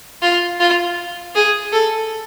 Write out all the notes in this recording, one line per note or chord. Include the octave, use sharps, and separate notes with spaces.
F4
F4
G#4
A4